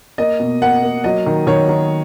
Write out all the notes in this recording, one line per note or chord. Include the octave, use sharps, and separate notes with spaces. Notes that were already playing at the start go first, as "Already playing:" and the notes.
A#3 D#5
B2
A#3 F#5
A#3
F#3 D#5
D#3
D#3 C#5
D#3